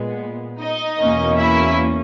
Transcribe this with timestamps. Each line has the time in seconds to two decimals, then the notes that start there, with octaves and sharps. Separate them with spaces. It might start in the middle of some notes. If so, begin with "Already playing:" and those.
Already playing: A#2 G#3 B3
0.60 D#4 D#5
1.00 E2 B2 A#3 C#4
1.38 E4 E5